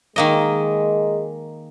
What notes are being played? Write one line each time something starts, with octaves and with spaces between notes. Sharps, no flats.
D#3 G#3 A#3 D#5